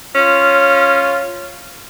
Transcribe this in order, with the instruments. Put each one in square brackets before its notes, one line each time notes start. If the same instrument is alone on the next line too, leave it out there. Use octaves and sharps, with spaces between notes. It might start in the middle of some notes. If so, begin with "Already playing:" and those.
[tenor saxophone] C#4 [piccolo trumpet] F4